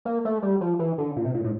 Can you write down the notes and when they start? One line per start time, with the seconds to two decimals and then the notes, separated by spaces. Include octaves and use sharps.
0.05 A#3
0.25 A3
0.42 G3
0.61 F3
0.79 E3
0.98 D3
1.16 A#2
1.25 C3
1.34 A#2
1.44 A2